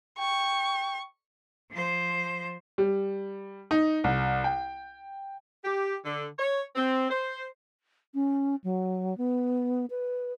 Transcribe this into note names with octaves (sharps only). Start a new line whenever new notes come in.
G5 C#6
F3 C5
G3
D#4
C2
G5
G4
D3
C#5
C4
C5
C#4
F#3
B3
B4